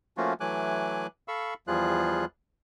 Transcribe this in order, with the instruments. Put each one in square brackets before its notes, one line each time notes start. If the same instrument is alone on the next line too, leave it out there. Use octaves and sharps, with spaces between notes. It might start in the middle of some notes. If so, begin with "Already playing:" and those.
[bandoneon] F3 A3 A#3 C#4 F4 F#4
E3 F#3 A3 G#5 D6 F#6
A4 F5 B5 C#6 E6
E2 F3 G3 F4 G#4 F#6